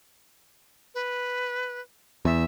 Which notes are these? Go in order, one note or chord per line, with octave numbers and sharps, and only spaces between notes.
B4
E2 E5